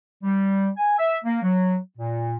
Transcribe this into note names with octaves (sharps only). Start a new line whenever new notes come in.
G3
G#5
E5
A#3
F#3
A#2